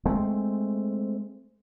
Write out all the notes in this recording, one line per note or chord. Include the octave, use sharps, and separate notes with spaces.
G#3 A3 C4